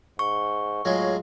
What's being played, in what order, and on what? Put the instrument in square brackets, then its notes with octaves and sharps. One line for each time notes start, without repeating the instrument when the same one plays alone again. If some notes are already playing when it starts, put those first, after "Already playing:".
[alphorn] G#2 [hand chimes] C#6
[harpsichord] A2 F#3 G#3 [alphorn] F4